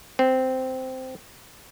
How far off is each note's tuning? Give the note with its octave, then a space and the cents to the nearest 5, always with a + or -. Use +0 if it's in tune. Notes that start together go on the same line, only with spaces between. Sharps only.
C4 -10